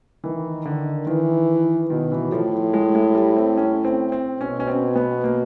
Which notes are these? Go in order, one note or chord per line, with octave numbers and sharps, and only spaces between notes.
D#3 E3
D3
D#3 E3
B2 D#3
E3
A2 F3
G#3
G#3
G3
C4
C#4
C4
C4
B2 C#4
C#4
C4
B3
A#3